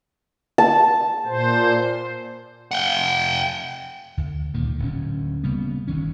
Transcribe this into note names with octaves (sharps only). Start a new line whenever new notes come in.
A5
A#2 C5
F#5 G5
D2
G2 A#2 D3 D#3
D1 D2 C#4
C#3 G3 A#3 B3
G1 D2 D#3 C#4